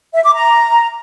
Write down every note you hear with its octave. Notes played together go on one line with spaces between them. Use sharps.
E5
D6
A#5